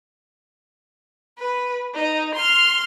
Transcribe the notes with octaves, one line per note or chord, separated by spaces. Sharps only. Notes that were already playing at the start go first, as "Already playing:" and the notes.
B4
D#4
C6 F6